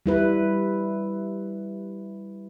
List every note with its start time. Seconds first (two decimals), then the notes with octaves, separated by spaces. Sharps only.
0.06 G3 E4 B4